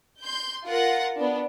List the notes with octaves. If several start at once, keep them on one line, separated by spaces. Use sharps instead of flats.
C6 G6
F4 A#4 F#5
B3 D4